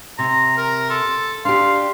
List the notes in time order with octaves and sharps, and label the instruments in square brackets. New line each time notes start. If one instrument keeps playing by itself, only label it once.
[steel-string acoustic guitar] C3 [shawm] A#5 [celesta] C6
[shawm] A#4
[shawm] A4 [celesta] C6
[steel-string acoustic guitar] D4 G4 [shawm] F5 [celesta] C6